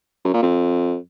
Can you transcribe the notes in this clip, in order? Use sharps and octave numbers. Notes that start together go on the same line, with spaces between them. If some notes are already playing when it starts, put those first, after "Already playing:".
F#2
A#2
F2